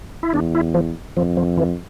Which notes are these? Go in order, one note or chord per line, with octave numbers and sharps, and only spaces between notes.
E4
E2 D4
E4
F3
F2 F3
F3
E3